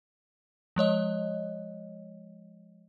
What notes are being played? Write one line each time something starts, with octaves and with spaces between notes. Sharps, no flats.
F3 G#3 C#5 D#5